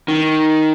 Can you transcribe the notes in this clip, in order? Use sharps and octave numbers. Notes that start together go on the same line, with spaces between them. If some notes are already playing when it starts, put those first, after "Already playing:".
D#3